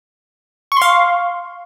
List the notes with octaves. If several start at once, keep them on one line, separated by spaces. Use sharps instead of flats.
F5 C6 C#6